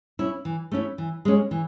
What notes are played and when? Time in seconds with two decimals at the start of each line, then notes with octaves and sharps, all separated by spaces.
0.19 C#4 E4
0.45 E3
0.72 A3 C#4 E4
0.98 E3
1.25 G#3 C#4
1.51 E3